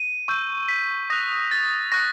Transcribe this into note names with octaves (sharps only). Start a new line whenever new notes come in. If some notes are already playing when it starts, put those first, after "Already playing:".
Already playing: D#7
C#6 E6 G6
B6
D#6 F#6 A#6
A6
C#6 F#6 A#6